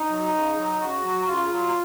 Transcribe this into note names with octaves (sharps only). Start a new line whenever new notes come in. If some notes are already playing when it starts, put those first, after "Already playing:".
Already playing: D#4
F#3
C#3
F#3
C#3 F#4
F#3
C#3 F4
F#3